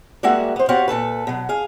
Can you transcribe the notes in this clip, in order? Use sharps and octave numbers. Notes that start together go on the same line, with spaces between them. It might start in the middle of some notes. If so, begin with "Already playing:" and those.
G3 G#3 A#3 F#4 E5 F#5
B3 C5
B3 F#4 G4 C5 C#5 F5
A#2 C#3 A4 B4
B2 F#3
G#4 F5